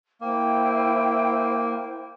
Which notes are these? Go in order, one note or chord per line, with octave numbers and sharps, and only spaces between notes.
A#3 E4 C5 G5